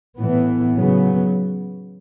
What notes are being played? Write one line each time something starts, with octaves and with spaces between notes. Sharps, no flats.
A2 E3 B3
C#3 F#3 B3